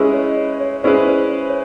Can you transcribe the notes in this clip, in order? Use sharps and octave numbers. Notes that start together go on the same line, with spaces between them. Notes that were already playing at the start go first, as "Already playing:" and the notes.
Already playing: G#3 C#4 E4 G#4 B4
C#5 D#5
C#5
C#5
G#3 C#4 E4 G#4 B4 C5 D5
C5
C5
C#5